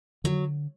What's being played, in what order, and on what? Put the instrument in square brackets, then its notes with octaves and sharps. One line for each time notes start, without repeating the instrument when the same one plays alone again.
[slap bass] D3 [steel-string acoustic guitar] F#3